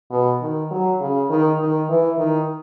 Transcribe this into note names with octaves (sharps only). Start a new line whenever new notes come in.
B2
D#3
F#3
C#3
D#3
D#3
E3
D#3